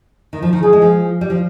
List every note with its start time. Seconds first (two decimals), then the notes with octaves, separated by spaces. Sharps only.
0.33 D#3
0.43 F3
0.53 D#3
0.63 F3 G#4
0.73 G#3
0.82 F3
1.21 G3
1.30 F3